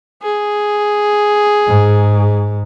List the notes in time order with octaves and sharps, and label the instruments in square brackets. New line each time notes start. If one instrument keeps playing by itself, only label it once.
[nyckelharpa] G#4
[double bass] G#2